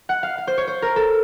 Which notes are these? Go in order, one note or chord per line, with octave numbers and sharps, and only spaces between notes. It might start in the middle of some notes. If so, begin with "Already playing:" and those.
F#5
F5
F5
C5
C#5
C5
A#4
A4